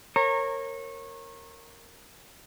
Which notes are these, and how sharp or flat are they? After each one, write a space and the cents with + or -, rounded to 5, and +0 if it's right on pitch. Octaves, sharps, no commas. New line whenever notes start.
A#4 -10 C#5 -25 A#5 -20